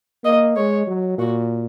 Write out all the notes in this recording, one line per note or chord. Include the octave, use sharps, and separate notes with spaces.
A#3 D#5
G#3 C#5
F#3
A#2 F#4